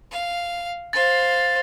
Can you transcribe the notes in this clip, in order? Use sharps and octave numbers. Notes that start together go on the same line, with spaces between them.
F5
C5 F5 A6